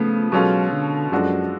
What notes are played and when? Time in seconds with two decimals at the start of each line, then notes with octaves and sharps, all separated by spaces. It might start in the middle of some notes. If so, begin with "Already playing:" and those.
Already playing: C#3 F3 A3 B3
0.32 B2 F#3 G#3 C#4 F4 A4
0.72 D3
1.11 F#2 F3 G#3 D4 F#4 A4